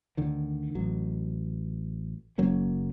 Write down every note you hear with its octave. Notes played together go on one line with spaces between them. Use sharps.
D2 D3 D#3
A1 F#3
F#1 F#3 A#3 C#4